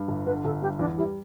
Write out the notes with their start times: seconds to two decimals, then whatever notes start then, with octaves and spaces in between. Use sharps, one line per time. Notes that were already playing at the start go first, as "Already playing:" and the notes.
Already playing: G2
0.08 G1
0.26 D3 B4
0.45 G1 A4
0.62 G2 G4
0.79 E2 D4
0.98 G3 E4